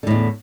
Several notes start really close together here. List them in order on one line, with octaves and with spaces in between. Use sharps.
D3 A2 E2